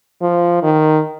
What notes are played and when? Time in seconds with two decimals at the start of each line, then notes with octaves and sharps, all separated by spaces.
0.22 F3
0.63 D#3